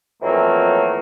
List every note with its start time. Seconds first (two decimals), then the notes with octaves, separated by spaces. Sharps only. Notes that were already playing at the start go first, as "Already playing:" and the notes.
0.22 F2 E3 F#3 A3 A#3